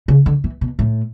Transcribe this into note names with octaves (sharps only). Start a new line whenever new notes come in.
C#3
D3
E3
B2
A2